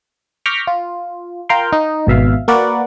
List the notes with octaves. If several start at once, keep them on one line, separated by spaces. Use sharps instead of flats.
C#6 D6 F6 G6 A#6 B6
F4
F4 A#4 F5 G5 C6
D#4
G#1 B2 E5 F5
A#3 F#4 A#4 B4 D5 F#5